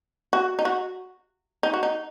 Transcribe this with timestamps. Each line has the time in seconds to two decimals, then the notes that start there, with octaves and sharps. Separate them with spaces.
0.33 F#4
0.59 D#4
0.65 F#4
1.63 D#4
1.74 F#4
1.83 D#4